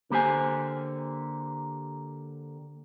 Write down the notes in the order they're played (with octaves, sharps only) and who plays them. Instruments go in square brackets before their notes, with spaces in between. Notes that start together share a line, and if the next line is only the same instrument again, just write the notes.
[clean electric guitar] D3 A#3 G4 C5 G#5